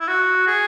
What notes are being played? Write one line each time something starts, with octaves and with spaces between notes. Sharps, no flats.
E4
F#4
G#4